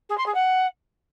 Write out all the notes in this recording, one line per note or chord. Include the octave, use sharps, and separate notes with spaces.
G#4
C6
G#4
F#5